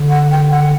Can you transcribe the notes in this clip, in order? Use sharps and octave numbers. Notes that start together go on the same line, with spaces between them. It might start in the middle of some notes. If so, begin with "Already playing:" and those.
Already playing: D3
F#5
G5
F#5